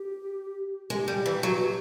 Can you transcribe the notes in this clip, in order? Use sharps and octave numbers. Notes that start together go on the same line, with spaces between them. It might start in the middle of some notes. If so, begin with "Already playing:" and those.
Already playing: G4
G#3 G4
G3
E3
F#3